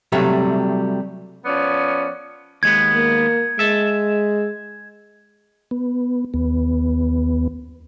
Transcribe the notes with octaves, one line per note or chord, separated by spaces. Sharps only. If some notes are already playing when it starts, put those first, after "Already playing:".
C3 F#3 G3 A3
F3 B3 C#4 D5
D#2 G#3 B3 G#6
A#3
G#3 E5 A5
B3
D#2 B3